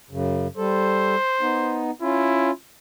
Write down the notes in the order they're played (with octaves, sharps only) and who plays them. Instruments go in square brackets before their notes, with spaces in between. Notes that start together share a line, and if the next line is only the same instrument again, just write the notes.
[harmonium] F#2 C#3
[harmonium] G3 A4 [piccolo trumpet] C5
[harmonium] B3 D#4
[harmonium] C#4 F4 [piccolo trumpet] E4